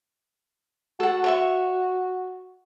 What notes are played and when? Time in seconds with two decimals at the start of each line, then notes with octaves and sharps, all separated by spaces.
1.00 F#4 A4 F#5
1.24 C#5 E5 C#6